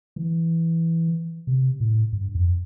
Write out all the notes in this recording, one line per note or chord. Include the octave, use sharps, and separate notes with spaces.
E3
C3
A2
G2
F2